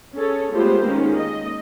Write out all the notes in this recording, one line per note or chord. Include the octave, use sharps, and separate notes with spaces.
C#4 G#4 A4 C#5
G#3 A3 B3 F4 G4 C5
D#3 G#3 A#3 C#4
D#5